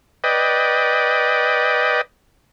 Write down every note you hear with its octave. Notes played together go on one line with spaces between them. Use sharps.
B4 D5 D#5 G5